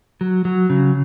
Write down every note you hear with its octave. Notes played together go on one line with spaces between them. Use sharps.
F#3
F#3
C#3